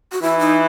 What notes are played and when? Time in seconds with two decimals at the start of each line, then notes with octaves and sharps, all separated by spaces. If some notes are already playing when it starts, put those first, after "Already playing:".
0.12 F#4
0.22 E3 E4
0.39 D#4